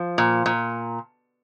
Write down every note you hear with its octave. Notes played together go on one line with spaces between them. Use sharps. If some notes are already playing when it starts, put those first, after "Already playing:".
Already playing: F3
A#2
A#2